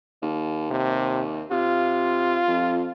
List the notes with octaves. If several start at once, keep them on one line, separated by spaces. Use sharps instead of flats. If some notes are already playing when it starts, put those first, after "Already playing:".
D#2
D#2 C3
C3 F4
F2